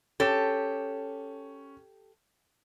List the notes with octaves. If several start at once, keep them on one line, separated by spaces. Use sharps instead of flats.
C#4 G4 A4 E7